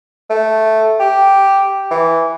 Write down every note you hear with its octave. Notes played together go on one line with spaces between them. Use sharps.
A3
G4
E3